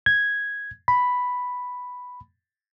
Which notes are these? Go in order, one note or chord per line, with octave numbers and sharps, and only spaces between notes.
G#6
B5